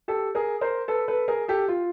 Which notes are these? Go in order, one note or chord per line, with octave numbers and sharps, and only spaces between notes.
G4 A4
G#4 A#4
A#4 C5
A4 B4
A4 B4
G#4 A#4
G4 A4
F4